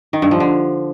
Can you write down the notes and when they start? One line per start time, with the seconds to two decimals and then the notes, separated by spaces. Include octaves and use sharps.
0.13 D#3
0.22 G2
0.31 F3
0.40 D3